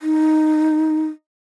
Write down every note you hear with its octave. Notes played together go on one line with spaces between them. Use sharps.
D#4